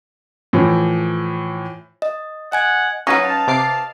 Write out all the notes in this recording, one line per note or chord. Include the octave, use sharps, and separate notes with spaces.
A2 E3 F3
D#5
D#5 F#5 G#5 G#6
F#3 C#4 D#4 B4
F5 A5
C3 D6 C7